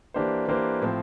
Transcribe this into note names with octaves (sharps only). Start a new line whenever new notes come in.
E3 A#3 D4 G4 C5
E3 A#3 D4 G4 C5
A2 F3 C4